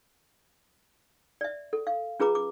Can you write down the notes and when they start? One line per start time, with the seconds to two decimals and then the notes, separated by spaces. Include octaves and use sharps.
1.41 D5 E5
1.73 A4
1.87 F5
2.20 C#4 F4 G#4 B4 A#5 D6
2.35 D6